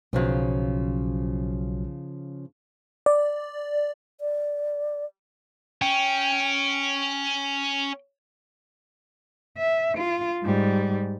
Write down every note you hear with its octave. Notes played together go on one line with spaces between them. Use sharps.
B1 C#3 F3 F#3 F4
D5
D5
C#4 G5
E5
F4
G#2 G3